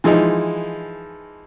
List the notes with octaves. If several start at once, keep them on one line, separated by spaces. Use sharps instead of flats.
E3 F3 G#3 D#4